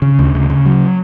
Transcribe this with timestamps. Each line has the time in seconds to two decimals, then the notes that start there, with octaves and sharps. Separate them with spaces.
0.02 C#3
0.19 D2
0.35 C#3
0.50 C#3
0.66 F#3